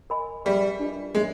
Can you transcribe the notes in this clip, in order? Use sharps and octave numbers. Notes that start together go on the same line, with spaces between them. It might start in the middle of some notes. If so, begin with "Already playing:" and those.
A#4 D#5 G#5 B5
G3 G#4 B4 E5
D4 F4 A#4 D#5
G#3 A#4 C#5 E5 G#5